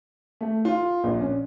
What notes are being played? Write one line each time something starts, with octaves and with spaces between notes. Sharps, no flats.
A3
F4
A#1
C#4